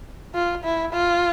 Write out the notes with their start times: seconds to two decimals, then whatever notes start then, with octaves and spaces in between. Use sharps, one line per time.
0.35 F4
0.64 E4
0.93 F4